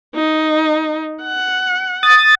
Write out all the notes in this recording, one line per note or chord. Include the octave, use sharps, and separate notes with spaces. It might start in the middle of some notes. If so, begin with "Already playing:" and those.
D#4
F#5
D#6 A6